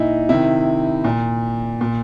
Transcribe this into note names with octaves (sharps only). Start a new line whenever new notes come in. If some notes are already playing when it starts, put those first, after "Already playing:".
Already playing: A#2 D#4 E4
C3 D#3 E4
A#2
A#2